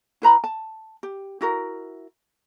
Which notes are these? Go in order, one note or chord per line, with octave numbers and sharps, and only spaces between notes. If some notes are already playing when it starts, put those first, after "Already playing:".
E4 B4 A#5 B5
A5
G4
E4 F#4 A#4